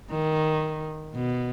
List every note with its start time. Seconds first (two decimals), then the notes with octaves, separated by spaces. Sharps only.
0.11 D#3
1.15 B2